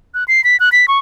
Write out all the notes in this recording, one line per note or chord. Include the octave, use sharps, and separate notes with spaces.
F#6
C7
B6
F#6
B6
C#6